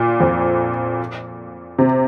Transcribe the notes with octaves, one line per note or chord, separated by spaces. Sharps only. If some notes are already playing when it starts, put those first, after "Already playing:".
Already playing: A#2
F2
C3